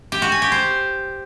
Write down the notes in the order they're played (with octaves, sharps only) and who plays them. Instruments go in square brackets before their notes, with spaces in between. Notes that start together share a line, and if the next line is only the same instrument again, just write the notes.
[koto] G4
F#4
G#5
G4
C5